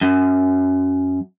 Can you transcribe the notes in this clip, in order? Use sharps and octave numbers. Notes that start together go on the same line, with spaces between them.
F#2